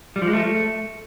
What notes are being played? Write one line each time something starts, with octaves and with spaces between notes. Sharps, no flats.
G3
F3
G#3
A3